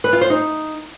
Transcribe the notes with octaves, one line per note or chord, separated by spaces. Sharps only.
B4
F4
C5
D#4